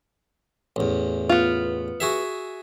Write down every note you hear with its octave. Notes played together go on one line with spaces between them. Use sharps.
A1 E2
B3 F4
F#4 G#4 E5